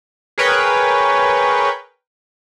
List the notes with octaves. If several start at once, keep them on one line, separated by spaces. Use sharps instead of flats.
G#4 A#4 B4 C#5 G5